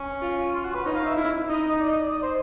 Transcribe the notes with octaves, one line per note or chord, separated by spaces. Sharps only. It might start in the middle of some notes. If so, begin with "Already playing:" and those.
Already playing: C#4
F4
F4
F#4
B4
D#4 C#5
F5
E5
E4
D#4 D#5
D5
D#5
D5
D#5
C5